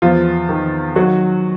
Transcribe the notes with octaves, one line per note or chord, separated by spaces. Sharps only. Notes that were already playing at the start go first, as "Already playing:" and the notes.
E2 F3 F4
D#3
D#3 F#3 F#4